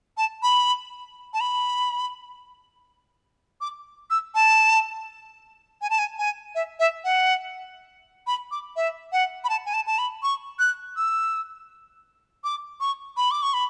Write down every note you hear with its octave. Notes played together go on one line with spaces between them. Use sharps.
A5
B5
A5
B5
D6
E6
A5
G#5
A5
G#5
G#5
E5
E5
F#5
B5
D6
E5
F#5
B5
A5
G#5
A5
A5
B5
C#6
F#6
E6
D6
C#6
B5
D6
C#6
B5